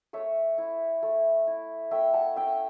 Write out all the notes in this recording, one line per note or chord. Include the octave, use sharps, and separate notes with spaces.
A3 C#5 E5
E4
A3
E4
A3 E5 G5
F#5 A5
C#4 E5 G5